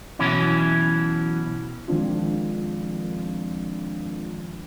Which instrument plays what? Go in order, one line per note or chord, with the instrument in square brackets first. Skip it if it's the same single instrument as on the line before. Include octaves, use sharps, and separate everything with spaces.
[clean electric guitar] B2 E3 F#3 C#4 E4
[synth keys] D#3 F3 G#3 C4 D4 F4